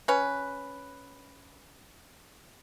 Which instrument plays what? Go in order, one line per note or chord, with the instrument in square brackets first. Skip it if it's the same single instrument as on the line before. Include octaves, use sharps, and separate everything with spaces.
[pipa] C#4 B4